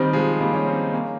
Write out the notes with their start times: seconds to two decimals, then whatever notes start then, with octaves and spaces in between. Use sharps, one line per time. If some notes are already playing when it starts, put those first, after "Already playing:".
Already playing: D#3 G3 C4 G4 C5
0.13 F3 G#3
0.40 G3 A#3
0.53 A#3 C#4
0.67 C4 D#4
0.93 A#3 C#4